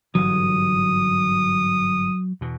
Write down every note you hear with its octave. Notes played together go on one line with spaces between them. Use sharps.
G1 G#2 E3 F#3 D#6
E2 B2